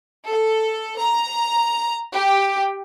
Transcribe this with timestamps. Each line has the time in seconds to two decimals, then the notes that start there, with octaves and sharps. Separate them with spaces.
0.27 A4
0.97 A#5
2.13 G4